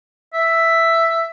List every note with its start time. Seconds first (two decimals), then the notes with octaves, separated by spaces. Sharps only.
0.34 E5